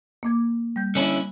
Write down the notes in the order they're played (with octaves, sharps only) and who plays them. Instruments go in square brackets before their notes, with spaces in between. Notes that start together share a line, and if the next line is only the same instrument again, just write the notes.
[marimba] A#3 D6 G#6
G3 G6
[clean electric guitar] D3 C#4 E4